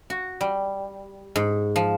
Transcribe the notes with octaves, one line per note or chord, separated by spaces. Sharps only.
F#4
G3
G#2
F3